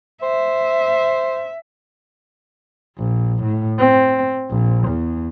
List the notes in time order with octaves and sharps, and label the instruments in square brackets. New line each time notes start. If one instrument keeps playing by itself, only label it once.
[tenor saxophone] C5 [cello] E5
[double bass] A#1
A2
C4
A#1
E2